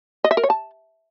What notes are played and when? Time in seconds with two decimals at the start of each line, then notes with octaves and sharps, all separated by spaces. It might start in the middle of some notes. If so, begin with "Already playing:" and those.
0.24 D#5
0.31 E5
0.37 A#4
0.43 C#5
0.50 A5